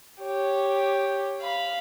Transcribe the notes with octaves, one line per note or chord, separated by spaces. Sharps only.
G4 C#5
F5 B5